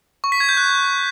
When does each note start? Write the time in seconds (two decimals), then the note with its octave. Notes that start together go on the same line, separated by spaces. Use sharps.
0.24 C#6
0.32 B6
0.40 G#6
0.49 G6
0.57 F#6